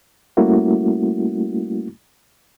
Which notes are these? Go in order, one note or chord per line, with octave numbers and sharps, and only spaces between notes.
G3 A3 A#3 C#4 E4 F#4